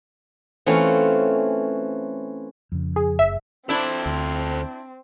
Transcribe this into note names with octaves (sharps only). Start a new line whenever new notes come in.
E3 A3 C4 C#4 F4 C#5
F2 C#3
G#4
F#1 E5
C4 D4 E4 A4 C5 E5
D2